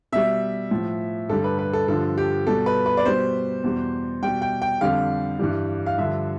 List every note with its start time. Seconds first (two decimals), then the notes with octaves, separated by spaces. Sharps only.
0.12 B2 G3 E5
0.71 A2 F3
1.29 G2 D3 G3 A4
1.44 B4
1.59 B4
1.73 A4
1.88 G2 D3 F3 A4
2.18 G4
2.47 B2 G3 A4
2.66 B4
2.86 B4
2.97 D5
3.05 B2 G3 C5
3.64 E2 B2 G3
4.22 B2 G3 G5
4.42 G5
4.62 G5
4.81 F2 D3 G3 F5
5.39 G2 E3 G3
5.86 F5
5.98 G2 D3 F3 E5